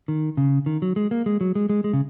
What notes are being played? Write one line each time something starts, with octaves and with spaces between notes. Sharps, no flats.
D#3
C#3
D#3
F#3
G#3
A#3
G#3
F#3
G#3
G#3
G#3
C#3